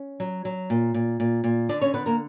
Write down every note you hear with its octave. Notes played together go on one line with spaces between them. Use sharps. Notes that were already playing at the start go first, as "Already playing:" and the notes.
Already playing: C#4
F#3
F#3
A#2
A#2
A#2
A#2
D3 D4 D5
C#4 C#5
D3 B3 B4
A#3 A#4